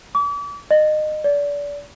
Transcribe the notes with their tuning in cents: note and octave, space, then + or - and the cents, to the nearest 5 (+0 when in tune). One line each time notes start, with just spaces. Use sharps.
D6 -40
D#5 -25
D5 -30